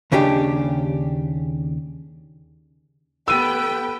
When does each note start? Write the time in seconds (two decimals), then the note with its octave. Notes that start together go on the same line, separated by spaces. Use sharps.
0.12 D#2 C#3 C#4 D4 G4
3.28 B3 G4 A4 B4 G5 E6 D#7